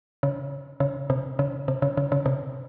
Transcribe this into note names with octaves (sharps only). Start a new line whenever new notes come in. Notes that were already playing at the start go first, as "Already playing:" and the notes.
C#3
C#3
C3
C#3
C3
C#3
C#3
C#3
C3